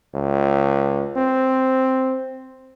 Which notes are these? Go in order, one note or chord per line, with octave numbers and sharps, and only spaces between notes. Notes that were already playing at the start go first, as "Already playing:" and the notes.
C#2
C4